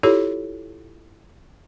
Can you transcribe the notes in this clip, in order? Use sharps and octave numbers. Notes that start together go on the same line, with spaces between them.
E4 F4 G4 A4 C#5